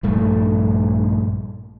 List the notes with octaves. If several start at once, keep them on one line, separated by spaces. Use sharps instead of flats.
A#1 G2 A3